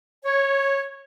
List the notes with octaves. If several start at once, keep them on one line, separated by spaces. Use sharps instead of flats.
C#5